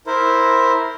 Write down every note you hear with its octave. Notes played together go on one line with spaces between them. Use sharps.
E4 A#4 C5